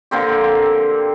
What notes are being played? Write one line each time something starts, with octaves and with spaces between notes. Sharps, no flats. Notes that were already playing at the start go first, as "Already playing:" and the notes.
D3 A#3 C4 G4